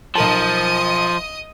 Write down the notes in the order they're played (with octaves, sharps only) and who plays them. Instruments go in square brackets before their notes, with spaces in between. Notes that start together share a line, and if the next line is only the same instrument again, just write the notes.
[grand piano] B1 A#4 A5 [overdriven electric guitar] F3 [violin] D#5 D#6